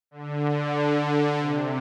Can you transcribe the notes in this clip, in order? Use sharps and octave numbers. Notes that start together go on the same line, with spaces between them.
D3
C3